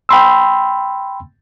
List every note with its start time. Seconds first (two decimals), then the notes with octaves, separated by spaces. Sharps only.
0.09 G5 B5 C6 E6